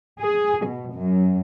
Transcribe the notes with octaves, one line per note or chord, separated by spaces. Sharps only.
G#4
B2
F#2